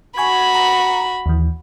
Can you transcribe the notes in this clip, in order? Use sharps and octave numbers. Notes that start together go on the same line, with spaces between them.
F#4 G#5 B5 C#6 G#6
A#5
D#2 E3